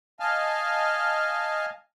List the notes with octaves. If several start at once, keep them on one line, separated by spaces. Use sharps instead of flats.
D#5 F5 G#5 A5 F6